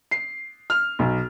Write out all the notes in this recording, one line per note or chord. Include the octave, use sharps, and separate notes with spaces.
C7
F6
B1